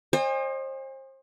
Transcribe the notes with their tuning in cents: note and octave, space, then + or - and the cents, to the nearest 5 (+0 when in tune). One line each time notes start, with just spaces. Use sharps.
C5 +35 D#5 -30 G#5 -40